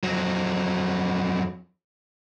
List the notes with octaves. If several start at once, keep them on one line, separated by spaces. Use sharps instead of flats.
F2 F#3